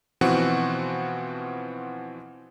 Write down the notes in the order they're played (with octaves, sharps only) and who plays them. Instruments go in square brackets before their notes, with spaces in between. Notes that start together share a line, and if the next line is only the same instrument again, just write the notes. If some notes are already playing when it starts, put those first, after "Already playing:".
[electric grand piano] B2 E3 F3 C4 F#4 F#5